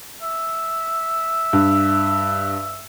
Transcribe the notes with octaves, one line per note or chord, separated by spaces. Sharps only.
E5
G2